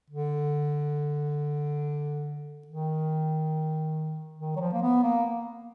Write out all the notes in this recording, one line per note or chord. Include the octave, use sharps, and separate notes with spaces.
D3
D#3
D#3
F#3
F3
A#3
B3
A#3